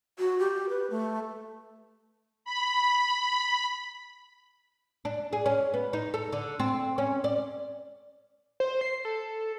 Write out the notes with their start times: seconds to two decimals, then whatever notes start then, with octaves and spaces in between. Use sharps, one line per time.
0.19 F#4
0.39 G4
0.69 B4
0.90 A3
2.45 B5
5.05 D4
5.33 G#4
5.46 C#4
5.74 B3
5.93 D#4
6.14 A4
6.32 D3
6.60 C4
6.98 C#4
7.24 D5
8.60 C5
8.81 C7
9.05 A4